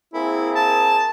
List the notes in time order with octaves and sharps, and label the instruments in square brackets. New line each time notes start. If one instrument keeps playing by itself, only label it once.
[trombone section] A#3 C4 G#4 [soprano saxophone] E4
[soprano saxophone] A5